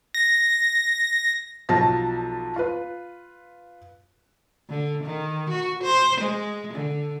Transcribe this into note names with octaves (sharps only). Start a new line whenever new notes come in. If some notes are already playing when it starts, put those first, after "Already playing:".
A#6
B1 F3 F#3 A5 A#6
F4 B4
D3
D#3
F#4
C5
G#3
D3